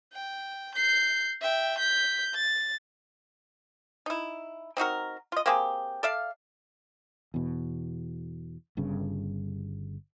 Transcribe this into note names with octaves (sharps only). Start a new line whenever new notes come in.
G5
G6 C7
E5 G5
G6 B6
A6
D#4 E4
C4 D#4 F#4 A#4
F4 D#5
A#3 C4 G4 G#4
A4 D5 E5 F5
E2 B2
G1 G2 C#3